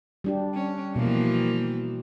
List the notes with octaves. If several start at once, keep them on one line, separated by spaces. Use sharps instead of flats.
G3 D4 G4
C#4
B2 E3 F3 A#3